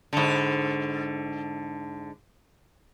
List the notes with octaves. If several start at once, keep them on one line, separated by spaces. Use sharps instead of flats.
G#2 D3